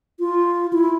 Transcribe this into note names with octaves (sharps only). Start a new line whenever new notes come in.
F4
E4